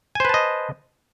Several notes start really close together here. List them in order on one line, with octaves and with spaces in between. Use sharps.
G#5 C5 B4 A5 D#5